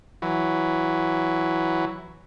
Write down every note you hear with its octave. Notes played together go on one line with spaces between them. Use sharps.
E3 F#3